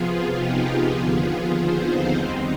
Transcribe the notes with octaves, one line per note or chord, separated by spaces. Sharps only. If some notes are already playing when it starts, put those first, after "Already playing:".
Already playing: C3 F3 B3 F4 G#4
D#4 G4
D#2 D3 F3 B3 F4 G#4
G#4 C5
C4 D#4
F2 D#3 G3 B3 C4 D#4